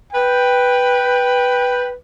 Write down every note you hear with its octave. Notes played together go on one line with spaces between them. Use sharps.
B4 G5